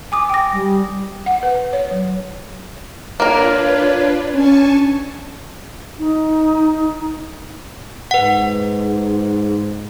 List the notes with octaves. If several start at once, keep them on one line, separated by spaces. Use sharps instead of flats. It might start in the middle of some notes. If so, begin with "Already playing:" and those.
G#5 D6 D#6
G5 A#6
G3
F#5
B4
C#5
F#3
A#3 D4 F4 A#4 B4 C#5
C#4 D4 G#5 A5 C#6
D#4
G#2 B4 F#5